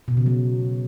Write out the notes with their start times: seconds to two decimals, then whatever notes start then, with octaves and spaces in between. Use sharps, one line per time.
0.08 B2
0.17 C#3
0.26 F#3